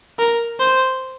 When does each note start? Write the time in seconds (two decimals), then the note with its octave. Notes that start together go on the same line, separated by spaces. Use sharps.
0.19 A#4
0.60 C5